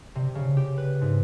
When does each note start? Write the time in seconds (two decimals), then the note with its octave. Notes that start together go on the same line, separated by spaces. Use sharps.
0.15 C3
0.35 C#3
0.57 G4
0.78 B4
1.01 G#2